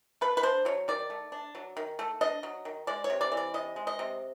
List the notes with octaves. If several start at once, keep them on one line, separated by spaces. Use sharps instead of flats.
A3 B4
B4
D4 C5
F#3 C#5
D#3 D5
A3
D4
F#3
D#3
A3
D4 D#5
F#3
D#3
G#3 D5
C#5
C3
D5
E3
D5
C3 D#5
G#3
D#5
C3